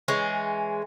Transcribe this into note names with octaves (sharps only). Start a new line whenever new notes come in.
E3 G#3 C#4